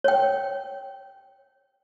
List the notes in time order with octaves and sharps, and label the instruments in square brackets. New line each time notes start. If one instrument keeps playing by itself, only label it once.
[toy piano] C#5 G5